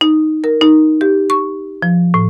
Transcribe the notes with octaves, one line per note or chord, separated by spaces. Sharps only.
D#4
A#4
D#4
G4
C#6
F3
A2